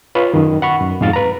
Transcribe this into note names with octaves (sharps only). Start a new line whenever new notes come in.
F4 B4 C#5
F#2 D#3
F#5 B5 C#6
F#2
F2 G#2 F5 A6
B4 A#5